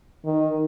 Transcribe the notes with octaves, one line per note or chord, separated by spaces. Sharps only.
D#3